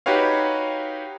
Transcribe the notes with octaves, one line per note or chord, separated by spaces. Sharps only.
D#4 F#4 G4 B4 C#5 F5